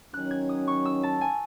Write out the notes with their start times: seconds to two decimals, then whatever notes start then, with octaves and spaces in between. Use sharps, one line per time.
0.13 D#3 F#3 C#4 F#6
0.31 G#6
0.49 D#6
0.67 C#6
0.85 E6
1.03 A5
1.21 G#5